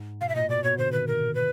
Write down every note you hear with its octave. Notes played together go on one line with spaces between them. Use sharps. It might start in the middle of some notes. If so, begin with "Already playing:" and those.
Already playing: G#2
B2 F5
E5
A#2 D#5
B2 D5
B2 C#5
D3 C5
D#3 B4
A#4
B4